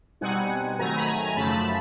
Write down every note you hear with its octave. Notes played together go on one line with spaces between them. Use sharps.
B2 G3 C4 D#4 F#5 G#5
G#2 D#3 F#3 A3 G#5 A#5
B5
G#5 A#5
F#2 C#3 F3 A3 A5 B5